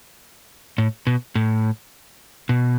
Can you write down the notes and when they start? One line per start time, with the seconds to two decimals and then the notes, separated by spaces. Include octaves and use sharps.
0.78 A2
1.07 B2
1.35 A2
2.49 B2